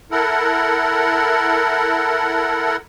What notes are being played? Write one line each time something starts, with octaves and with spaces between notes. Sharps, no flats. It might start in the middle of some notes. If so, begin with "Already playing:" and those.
E4 A4 A#4 F#5